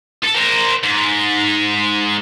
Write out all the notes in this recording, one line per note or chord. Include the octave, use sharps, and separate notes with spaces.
A4
A#4 C5
G#2